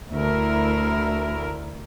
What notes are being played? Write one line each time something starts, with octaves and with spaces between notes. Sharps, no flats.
D2 E4 A#4